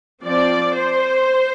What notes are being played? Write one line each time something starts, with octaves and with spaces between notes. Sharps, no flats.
F3 C4 D5
C5